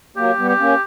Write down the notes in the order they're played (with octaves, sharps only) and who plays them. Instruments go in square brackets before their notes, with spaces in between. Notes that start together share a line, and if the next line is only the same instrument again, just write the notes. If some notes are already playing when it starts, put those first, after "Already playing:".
[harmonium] F#3 A#3 [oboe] G4
[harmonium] G3 B3
[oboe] G4
[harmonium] A#3 C#4